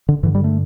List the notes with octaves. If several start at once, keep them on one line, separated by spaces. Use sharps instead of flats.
D3
G2 D3 E3
G3
A3